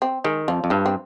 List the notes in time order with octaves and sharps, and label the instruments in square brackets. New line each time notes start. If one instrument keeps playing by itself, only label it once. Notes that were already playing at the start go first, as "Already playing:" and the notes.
[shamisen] C4
[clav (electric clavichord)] D#3 [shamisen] G#3
[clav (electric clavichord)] F2 [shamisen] F3
[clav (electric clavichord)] F2
[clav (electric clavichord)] G2 [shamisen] F3
[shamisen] C4